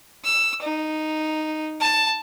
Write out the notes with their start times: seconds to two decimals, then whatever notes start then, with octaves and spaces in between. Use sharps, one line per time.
0.24 E6
0.62 D#4
1.81 A5